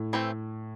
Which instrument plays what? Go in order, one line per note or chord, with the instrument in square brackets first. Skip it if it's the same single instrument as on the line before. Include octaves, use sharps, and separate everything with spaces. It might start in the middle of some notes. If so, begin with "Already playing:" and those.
Already playing: [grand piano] A2
[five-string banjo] E3 A3 C4